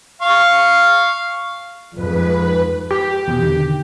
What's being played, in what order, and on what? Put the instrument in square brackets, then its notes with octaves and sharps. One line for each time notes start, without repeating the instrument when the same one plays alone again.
[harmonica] F5 C#6
[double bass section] F2 G#2 [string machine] B4
[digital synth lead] G4
[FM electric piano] E2 B2
D3 D#3